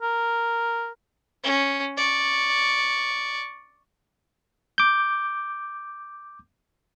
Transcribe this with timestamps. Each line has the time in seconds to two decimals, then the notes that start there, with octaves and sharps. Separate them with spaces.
0.03 A#4
1.44 C#4
1.97 D5 C#6
4.78 D6 G6